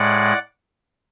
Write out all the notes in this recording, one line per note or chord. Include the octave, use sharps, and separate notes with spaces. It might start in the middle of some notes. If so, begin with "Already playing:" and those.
Already playing: A2 G#3 D5 F#5